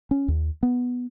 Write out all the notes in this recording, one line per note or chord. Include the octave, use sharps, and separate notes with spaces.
C#4
D#2
B3